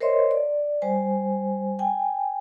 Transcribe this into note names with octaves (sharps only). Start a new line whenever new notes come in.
A#4 C5 C#5 D#5 E5 C6
D5
G3 C5 G#5
G5 G#5